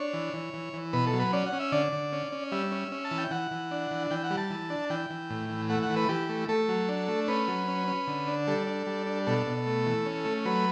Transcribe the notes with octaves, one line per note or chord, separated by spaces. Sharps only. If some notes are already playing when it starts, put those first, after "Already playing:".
Already playing: D4 C#5
E3
E3
E3
E3
B2 B4
A4
F#3
B4
C#4 D5
F#5
C#4
E5
D3 D5
D3
C#4
C#4
G3 E5
C#4
C#4
A5
E3
G5
E3 F#5
E3
D4
E3
E3 G5
F#5
G3
A5
E3
D4
E3 G5
E3
A2
E3
A3 F#5
F#5
E3
B4
E3 G4
A3
A3 A4
F#3
D4
A3
C#4 B4
F#3
C#4
C#4
D3
D4
G3 A4
D4
G3
D4
B2 A4
B2
A3
E3
C#4
A3
F#3 B4